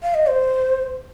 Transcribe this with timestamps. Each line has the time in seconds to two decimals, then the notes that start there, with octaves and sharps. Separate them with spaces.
0.03 F5
0.14 D#5
0.27 C5